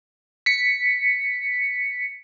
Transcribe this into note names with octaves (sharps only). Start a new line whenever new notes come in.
B6 C#7